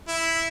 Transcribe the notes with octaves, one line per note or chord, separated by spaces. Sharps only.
E4